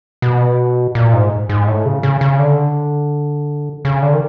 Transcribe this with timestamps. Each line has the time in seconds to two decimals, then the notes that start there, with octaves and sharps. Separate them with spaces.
0.22 B2
0.95 A#2
1.13 G#2
1.49 G#2
1.67 A2
1.86 C#3
2.03 C#3
2.21 C#3
2.39 D3
3.85 C#3
4.02 D3
4.13 D#3